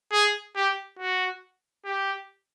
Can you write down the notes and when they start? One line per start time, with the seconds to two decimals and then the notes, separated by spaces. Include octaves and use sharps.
0.12 G#4
0.56 G4
0.99 F#4
1.85 G4